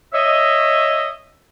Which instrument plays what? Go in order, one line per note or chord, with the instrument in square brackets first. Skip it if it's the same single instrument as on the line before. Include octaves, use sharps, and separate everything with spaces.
[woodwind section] C#5 D#5 E5